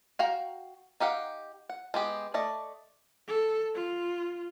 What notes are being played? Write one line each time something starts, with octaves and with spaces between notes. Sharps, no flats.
F#4 F5 G5 A#5
D#4 G4 F5 F#5
F#5
G#3 B3 G4
A3 D5 D#5
A4
F4